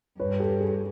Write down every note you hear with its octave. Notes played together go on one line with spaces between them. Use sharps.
G2 B4 C#5
G4 A4
G#4